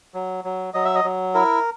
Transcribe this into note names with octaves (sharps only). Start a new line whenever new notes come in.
F#3
F#3
F#3 D#5
E5
D#5
F#3
E4 A#4